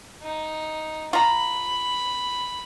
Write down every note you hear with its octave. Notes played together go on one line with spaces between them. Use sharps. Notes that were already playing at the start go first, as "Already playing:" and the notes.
D#4
F4 A#5 B5